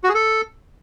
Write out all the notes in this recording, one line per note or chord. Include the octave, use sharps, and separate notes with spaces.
F#4
G#4
A4